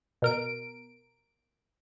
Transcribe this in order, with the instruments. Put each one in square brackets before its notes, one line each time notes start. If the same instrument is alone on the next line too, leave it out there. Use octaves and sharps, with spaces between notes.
[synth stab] B2 A#4 D7